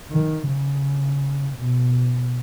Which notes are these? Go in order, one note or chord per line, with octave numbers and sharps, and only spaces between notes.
D#3
C#3
B2